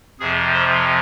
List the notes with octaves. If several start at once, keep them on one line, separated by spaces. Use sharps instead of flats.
F2 C3 F3 G#4
C5